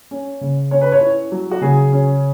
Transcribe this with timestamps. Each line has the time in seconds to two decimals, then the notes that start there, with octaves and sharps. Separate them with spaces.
0.11 C#4
0.41 C#3
0.71 C#4 C#5
0.81 B4
0.92 C#5
1.01 E4
1.32 F#3
1.51 F#4
1.61 C#3 G#4
1.92 C#4